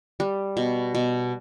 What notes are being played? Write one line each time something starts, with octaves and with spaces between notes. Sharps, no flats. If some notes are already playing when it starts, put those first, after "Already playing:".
G3
B2
B2